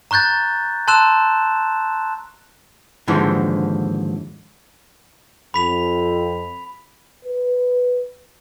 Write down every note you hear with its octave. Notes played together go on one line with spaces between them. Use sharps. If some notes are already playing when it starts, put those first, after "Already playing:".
A#5 C#6 F#6 G6 A6
A5 C6 E6 F#6 E7
D#2 G#2 D3 E3 F3
F2 B5 B6 F7
B4